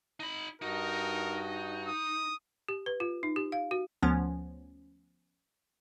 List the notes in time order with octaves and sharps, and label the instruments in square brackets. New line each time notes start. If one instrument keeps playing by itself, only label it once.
[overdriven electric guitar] D#4 B5
[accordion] G2 F#4 [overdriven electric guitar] D#4 [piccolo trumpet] A#4
[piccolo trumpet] D#6
[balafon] G4
B4
F4
D#4
G4
F5
F#4
[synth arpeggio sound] D2 F3 B3 C#4